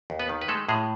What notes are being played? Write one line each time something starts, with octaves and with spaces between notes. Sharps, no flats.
D#2
B3 B4
D#3
B4
G#3 A3 A4
A2 G#3 G#4